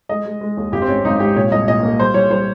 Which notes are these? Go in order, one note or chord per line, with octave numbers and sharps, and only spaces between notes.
G#3 D#5
G#3
G#3
D#2
G#1 G4
C4
G#2 C#4
G#1 D#4
G#2 G4
A#2 C#5
C2 D#5
A#2 D#5
A#3
G3 C5
G3 C#5
G3 C5